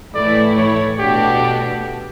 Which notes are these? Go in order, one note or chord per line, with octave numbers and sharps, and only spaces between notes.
A2 E3 A3 E4 D5
C#5
B2 A3 D4 F#4 G4